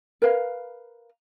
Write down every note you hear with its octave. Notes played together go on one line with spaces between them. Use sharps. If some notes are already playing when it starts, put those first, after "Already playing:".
A#4 B4 F5